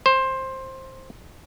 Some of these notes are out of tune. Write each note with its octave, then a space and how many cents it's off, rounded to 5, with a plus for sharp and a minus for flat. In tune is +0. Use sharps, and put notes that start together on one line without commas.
C5 +15